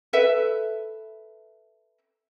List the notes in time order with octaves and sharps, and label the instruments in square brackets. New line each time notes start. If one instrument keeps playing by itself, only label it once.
[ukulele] A4 B4 E5